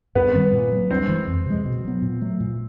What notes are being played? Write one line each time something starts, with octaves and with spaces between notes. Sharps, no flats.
G2 B3 B4
D#3 G3 C4
A#2
F#3 A#3
G2 C4 C5
E3 G#3
F2
C3 F3 G#3
B2
F#3 B3
A#2
F#3 A3
A#2